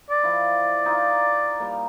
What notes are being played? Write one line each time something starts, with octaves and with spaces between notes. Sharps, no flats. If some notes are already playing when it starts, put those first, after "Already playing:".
D5
F3 E4
D#4 F4
G3 A#3